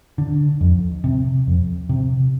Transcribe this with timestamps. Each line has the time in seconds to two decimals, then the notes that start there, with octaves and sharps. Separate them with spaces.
0.18 D3
0.61 F2
1.04 C3
1.47 F2
1.89 C3